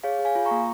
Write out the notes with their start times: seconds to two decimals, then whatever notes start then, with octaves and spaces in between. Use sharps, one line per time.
0.04 G#4 C#5 F5
0.19 G#4
0.25 F5 G#5
0.35 F4
0.45 A#5 C#6
0.51 A#3